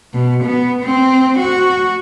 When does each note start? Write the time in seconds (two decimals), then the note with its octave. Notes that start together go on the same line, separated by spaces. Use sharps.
0.14 B2
0.44 B3
0.83 C4
1.39 F#4